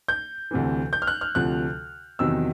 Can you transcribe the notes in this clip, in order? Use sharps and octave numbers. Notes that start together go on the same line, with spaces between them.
G6
D2 C3 E3
G6
F6
F#6
F6
D2 C3 F3 F#6
E2 C3 D#3 F#3 E6